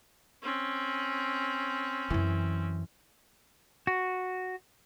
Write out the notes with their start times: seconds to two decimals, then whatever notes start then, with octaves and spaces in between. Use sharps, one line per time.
0.43 C4 C#4
2.10 F#2 E3
3.87 F#4